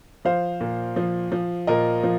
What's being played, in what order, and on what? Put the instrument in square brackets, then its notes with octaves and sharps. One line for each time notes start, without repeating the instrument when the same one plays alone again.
[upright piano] F3 C5 F5
A#2
F3
F3
A#2 A#4 D#5
F3